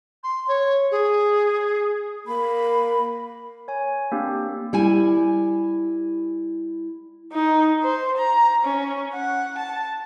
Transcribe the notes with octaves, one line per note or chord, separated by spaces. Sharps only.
C6
C#5
G#4
A#3 B5
C#5 G#5
A#3 C4 D4 G4
G3 E4 G#5
D#4
C5
A#5
C#4
F#5
A5